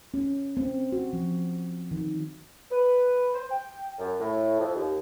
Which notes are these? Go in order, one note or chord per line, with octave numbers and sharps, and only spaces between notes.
C#4
C4
F#4
F3
D#3
B4
C5
G5
F#2
A2
F2
D#2